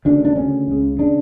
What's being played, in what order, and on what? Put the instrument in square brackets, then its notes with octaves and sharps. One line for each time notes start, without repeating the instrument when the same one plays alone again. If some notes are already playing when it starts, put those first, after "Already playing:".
[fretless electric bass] D2 C#3 D4
D4
D2 C#3 C#4
C#2 C#3
C#3 D4